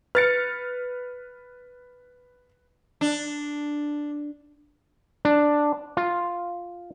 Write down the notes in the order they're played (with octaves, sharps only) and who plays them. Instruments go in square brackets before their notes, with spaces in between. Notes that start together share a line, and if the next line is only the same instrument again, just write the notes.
[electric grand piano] B4 [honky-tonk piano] F6 A6 C#7
[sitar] D4
[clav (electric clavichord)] D4
F4